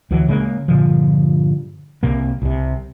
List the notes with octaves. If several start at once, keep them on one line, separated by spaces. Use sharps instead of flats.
D2 E3 F#3
C#3 G#3 A#3
G2 A#2 D3 F3
C2 C3 A#3
C2 C3